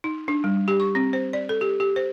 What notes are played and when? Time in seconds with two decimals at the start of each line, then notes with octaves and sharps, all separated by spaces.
0.04 D#4
0.28 D4
0.44 G3
0.68 G4
0.80 C#6
0.95 C4
1.13 C5
1.33 D5
1.49 A4
1.61 G4
1.80 G4
1.96 C5